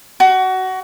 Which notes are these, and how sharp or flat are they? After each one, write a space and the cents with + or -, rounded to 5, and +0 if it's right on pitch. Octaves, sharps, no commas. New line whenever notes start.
F#4 +20